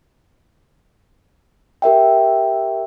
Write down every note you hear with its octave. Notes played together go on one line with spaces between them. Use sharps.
G4 A#4 E5 G5